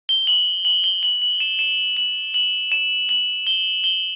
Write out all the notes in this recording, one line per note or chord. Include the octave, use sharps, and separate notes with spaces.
G7
F#7
F#7
G7
F#7
F#7
E7
E7
F#7
F#7
E7
F#7
G7
G7